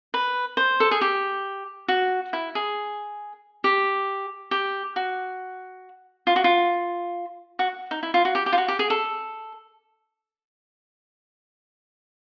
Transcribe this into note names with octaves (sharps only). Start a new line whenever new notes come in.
B4
C5
A4
G#4
G4
F#4
E4
G#4
G4
G4
F#4
F4
F#4
F4
F#4
D#4
E4
F4
F#4
G4
G4
F4
F#4
G4
G#4
A4